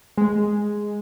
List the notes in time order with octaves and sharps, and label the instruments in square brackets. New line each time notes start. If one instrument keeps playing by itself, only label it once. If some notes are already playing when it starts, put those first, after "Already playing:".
[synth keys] G#3